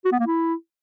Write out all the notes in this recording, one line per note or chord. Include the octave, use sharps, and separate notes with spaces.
F#4
B3
A#3
E4